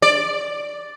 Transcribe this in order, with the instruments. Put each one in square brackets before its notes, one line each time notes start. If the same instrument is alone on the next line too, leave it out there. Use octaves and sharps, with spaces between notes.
[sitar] D5